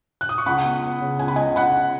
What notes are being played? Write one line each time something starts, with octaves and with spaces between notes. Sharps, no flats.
F#6
D#6
C#6
C#2 F#5 B5
B3
B3
C#3
C#2 G#5
B5
C#2 D#5 G#5
C#2 F#5 B5